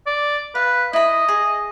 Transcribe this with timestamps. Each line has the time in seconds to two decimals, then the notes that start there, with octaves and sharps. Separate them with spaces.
0.06 D5
0.55 B4 F5
0.93 E4 D#5 B5
1.28 G#4